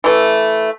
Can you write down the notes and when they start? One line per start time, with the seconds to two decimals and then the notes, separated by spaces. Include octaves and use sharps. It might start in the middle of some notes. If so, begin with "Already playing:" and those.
0.04 E3 A3